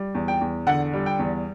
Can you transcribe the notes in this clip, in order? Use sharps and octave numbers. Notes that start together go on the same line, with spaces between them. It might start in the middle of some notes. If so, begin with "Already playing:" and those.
Already playing: G3
E2
G5
E2
D3 F#5
G3
G5
E2